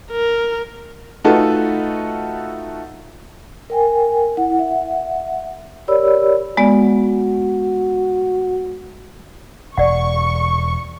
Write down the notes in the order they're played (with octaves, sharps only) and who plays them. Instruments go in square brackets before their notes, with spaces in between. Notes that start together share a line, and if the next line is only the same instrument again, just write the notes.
[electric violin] A#4
[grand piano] A3 D#4 F4 F#4 A4 B4
[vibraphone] A#4 G5 G#5
E4 F#5
E5 F#5
G4 A#4 C#5 D5 B5 E6
[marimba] G#3 B3 D5 [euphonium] F#4
[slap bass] E1 [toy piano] D5 F#5 [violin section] C#6